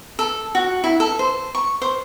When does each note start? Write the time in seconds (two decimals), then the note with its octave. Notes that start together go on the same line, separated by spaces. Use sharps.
0.19 A4
0.55 F#4
0.84 E4
1.00 A4
1.19 C5
1.55 C#6
1.82 C5